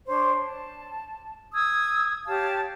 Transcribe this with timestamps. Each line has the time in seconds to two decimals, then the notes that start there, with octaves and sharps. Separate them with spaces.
0.07 D4 C5 C#5 C6
0.44 A5
1.54 D#6 E6 G#6
2.26 G4 C#5 F5 A5